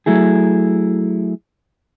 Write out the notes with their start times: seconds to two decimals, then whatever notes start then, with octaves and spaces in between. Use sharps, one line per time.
0.06 F#3 A3 E4 G#4